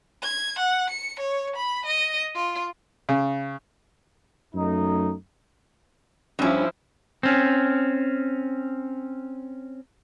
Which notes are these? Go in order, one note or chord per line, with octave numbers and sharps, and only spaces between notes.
G#6
F#5
C#7
C#5
B5
D#5
F4
C#3
F#2 A3 D#4
G2 F3 C#4 E4
C4 C#4